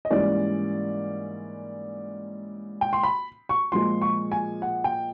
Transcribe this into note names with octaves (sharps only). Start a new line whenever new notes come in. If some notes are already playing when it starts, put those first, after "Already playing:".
D#5
G#2 E3 G3 A#3 C#4 D5
G5
C6
B5
C#6
A#2 F3 G#3 C6
C#6
G#5
F#5
G5